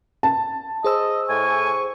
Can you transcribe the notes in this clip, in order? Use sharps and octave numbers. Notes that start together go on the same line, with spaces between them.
A5
G#4 C5 D#5 E6
A2 G#5 C#6